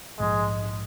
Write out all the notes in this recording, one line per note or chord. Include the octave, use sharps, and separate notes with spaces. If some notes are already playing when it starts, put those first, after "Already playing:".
A#1 G#2 F3 G#3